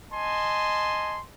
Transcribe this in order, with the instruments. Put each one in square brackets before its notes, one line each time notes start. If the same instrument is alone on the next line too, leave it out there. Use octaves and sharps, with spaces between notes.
[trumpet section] D#5 G#5 A5 C6